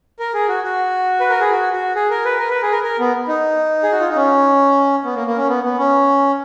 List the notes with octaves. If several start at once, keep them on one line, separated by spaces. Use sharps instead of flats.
A#4
G#4
F#4
F#4
B4
A#4
G#4
F#4
F#4
G#4
A#4
B4
A#4
B4
G#4
A#4
A#4
B3
D#4
G#4
F#4
F4
D#4
C#4
B3
A#3
A#3
C#4
B3
B3
C#4